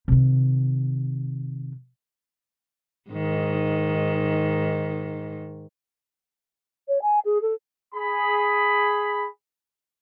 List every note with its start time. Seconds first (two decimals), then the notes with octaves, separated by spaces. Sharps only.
0.08 C3 D#3
3.10 G#2 D#3
6.88 C#5
7.02 G#5
7.25 G#4
7.42 A4
7.94 G#4 B5